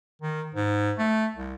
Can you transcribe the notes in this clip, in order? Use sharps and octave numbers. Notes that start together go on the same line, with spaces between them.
D#3
G#2
A3
C2